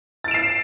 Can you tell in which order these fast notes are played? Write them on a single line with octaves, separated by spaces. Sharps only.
A6 D7 E7 C7